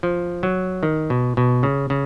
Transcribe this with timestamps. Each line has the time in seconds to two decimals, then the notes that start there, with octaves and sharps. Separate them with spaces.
0.03 F3
0.43 F#3
0.83 D#3
1.10 B2
1.37 B2
1.63 C#3
1.90 C#3